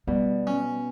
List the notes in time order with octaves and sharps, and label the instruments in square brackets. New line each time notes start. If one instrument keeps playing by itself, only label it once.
[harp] B2 [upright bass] G3 [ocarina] D5
[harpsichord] C#4